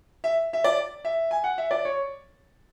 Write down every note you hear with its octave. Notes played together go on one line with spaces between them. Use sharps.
E5
E5
D5
E5
G#5
F#5
E5
D5
C#5